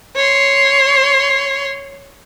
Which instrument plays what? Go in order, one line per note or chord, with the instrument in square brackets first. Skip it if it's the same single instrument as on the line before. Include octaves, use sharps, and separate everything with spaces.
[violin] C#5 C6